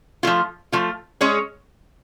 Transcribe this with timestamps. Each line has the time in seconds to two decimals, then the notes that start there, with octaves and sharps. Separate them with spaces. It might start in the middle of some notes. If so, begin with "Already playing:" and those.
0.23 F3 A3 F4
0.72 F3 A3 F4
1.21 G#3 C#4 G#4 C#5